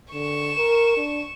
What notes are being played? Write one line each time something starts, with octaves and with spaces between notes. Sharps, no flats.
D3 C#6 E7
A#4
D4